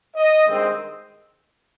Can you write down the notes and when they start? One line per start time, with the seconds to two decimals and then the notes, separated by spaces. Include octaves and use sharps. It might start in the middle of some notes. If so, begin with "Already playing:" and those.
0.16 D#5
0.46 G2 D#3 G#3 C4